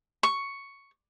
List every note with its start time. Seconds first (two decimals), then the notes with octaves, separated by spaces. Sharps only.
0.23 C#6